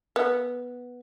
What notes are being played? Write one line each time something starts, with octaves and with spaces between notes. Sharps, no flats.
B3